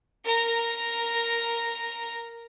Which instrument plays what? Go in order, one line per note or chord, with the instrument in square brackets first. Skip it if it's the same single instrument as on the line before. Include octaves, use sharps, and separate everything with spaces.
[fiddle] A#4 A#5